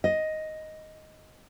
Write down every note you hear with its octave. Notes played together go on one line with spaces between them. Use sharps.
D#5